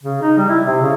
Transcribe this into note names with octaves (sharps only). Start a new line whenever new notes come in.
C#3
D#4
G3
E4
C3
C#3